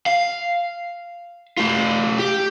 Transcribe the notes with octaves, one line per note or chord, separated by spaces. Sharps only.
F5
A3 F4
G4